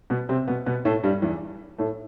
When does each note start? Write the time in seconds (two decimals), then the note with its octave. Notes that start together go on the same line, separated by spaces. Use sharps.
0.10 B2 B3
0.29 C3 C4
0.48 B2 B3
0.66 B2 B3
0.85 A2 A3
1.04 G2 G3
1.22 E2 E3
1.78 A2 A3